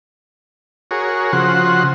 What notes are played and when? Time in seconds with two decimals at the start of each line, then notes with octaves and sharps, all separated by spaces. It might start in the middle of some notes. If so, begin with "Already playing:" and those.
0.91 F#4 G#4 A#4 C#5
1.33 C#3 F3 F#4 C5 F#5